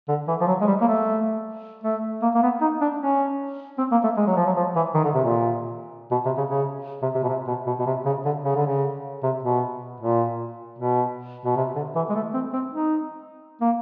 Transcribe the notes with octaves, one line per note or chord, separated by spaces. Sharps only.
D3
E3
F3
F#3
G#3
G3
A#3
A3
A3
A#3
A#3
B3
D#4
D4
C#4
C4
A#3
A3
G#3
F#3
F3
F#3
F3
E3
D#3
D3
C3
A#2
B2
C3
C#3
C#3
C3
C3
B2
C3
B2
B2
B2
C3
C#3
D3
C#3
D3
C#3
C3
B2
A#2
B2
B2
C3
D3
E3
G#3
A3
C4
C4
D#4
A#3